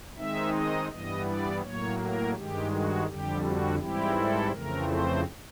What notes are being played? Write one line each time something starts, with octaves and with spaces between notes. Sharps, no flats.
D#3 G#3 C4 D#4 E5
D#5
G2 E3 G3 B3 D#5
D5
A2 F#3 A#3 C#5
A#4
G2 D#3 G#3 G4
F#4
F2 D3 G3 G4
F#4
G#2 E3 G3 C4 E4 G4
A4
F2 C#3 E3 A3 C4 A#4
C5